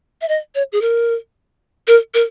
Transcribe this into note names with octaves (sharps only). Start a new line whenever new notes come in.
E5
D#5
C#5
G#4
A#4
A#4
A#4